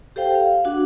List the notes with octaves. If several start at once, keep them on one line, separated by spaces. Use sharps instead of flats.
G4 A4 C5 F5 G5
F5
D4 F#4 F#5